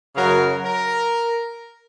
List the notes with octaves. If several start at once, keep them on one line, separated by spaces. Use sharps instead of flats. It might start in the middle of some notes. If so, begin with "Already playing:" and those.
F#2 C#3 F#3 A#4
A#4